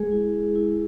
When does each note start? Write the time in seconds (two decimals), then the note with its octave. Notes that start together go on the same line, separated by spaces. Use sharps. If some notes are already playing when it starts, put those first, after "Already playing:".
Already playing: G#3 G#4
0.12 E4
0.55 E4